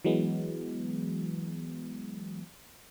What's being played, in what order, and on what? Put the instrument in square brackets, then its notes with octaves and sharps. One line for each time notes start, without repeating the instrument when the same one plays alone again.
[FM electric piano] E3 F#3 G#3 B3